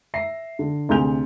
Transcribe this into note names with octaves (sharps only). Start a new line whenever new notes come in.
E5 A#6 C7
D3
D2 C3 G#4 G6 F7